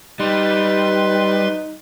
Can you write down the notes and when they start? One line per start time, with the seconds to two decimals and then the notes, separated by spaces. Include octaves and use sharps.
0.20 G3 D#4 B4 C6